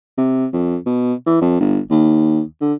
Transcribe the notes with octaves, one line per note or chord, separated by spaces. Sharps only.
C3
F2
B2
E3
F2
G1
D#2
D3